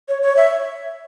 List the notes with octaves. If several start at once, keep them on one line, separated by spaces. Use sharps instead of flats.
C#5
C#5
E5